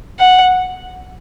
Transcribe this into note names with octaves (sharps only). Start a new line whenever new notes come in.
F#5